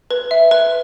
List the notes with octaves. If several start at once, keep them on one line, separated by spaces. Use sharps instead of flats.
B4
E5
B4